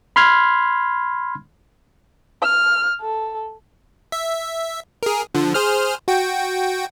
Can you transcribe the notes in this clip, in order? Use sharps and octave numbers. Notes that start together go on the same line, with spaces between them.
B5 C6 F6 G#6
F6
A4
E5
G#4 A#4
D3 F3
G#4 C5 F6
F#4 G5